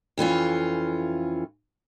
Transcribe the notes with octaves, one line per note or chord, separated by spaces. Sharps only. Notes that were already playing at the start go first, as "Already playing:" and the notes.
F2 E3 C#4 F4